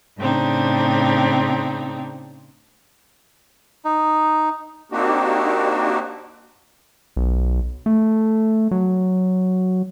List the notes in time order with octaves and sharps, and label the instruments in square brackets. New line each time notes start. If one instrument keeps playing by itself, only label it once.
[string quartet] A2 C#3 C4 D4 D#4
[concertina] D#4
[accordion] A#3 C4 D4 D#4 F#4 G4
[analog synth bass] B1
A3
F#3